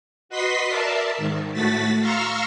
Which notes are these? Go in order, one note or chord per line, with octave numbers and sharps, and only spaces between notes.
F#4 B4 D#5 C6 B6 C7
A#4 D5 E5 A5
G#2 D#3
A2 A3 F#4 A6 B6
F5 A#5 C6 C#6 E6 F6